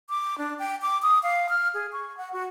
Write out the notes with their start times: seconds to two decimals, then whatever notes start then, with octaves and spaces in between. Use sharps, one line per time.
0.10 D6
0.38 D4
0.59 G5
0.82 D6
1.02 D#6
1.23 F5
1.49 F6
1.74 G#4
1.92 C#6
2.17 F#5
2.33 F#4